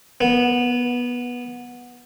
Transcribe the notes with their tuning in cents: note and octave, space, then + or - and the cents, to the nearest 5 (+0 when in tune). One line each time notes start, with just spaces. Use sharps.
B3 -15